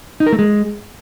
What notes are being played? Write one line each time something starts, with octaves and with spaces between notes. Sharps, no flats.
D#4
A#4
A3
G#3